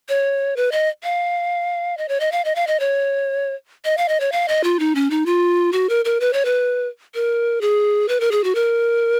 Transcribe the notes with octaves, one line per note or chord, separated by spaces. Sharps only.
C#5
B4
D#5
F5
D#5
C#5
D#5
F5
D#5
F5
D#5
C#5
D#5
F5
D#5
C#5
F5
D#5
F4
D#4
C#4
D#4
F4
F#4
A#4
A#4
B4
C#5
B4
A#4
G#4
B4
A#4
G#4
F#4
A#4